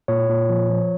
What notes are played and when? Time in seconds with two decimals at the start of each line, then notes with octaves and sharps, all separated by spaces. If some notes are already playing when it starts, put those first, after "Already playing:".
0.08 A#2 C#5
0.30 A#2
0.50 F3
0.70 F3